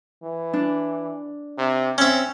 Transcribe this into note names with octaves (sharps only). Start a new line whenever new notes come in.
E3
D4
C3
C4 C#4 E5